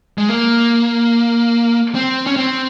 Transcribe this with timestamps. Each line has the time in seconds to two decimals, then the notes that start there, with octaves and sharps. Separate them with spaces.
0.18 G#3
0.29 A#3
1.95 C4
2.27 C#4
2.36 C4